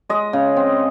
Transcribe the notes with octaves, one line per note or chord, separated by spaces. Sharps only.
G#3 D#5
C#3
C4